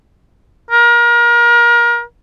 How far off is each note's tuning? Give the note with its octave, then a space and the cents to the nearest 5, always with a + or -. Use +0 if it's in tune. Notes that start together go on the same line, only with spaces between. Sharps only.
A#4 +30